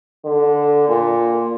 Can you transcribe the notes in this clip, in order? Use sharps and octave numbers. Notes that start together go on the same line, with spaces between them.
D3
A#2